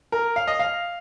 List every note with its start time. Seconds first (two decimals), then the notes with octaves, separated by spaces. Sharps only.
0.12 A#4
0.36 F5
0.47 D#5
0.59 F5